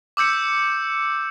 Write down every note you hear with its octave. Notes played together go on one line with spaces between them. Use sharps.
D6 E6 G6 C#7